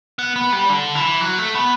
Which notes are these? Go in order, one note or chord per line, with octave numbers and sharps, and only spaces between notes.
B3
B3
G3
D3
E3
F#3
A3
B3